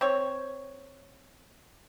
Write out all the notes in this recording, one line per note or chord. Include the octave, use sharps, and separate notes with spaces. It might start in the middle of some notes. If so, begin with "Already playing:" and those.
C4 C#5